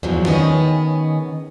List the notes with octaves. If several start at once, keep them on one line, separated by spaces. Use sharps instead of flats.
E2 G2 C#3 F3 F#3
D#3 B3 C#4 G#4 D#5